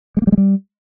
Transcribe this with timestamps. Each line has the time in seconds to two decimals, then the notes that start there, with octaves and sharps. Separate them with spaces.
0.17 G#3
0.22 A#3
0.27 G3
0.32 G#3
0.37 G3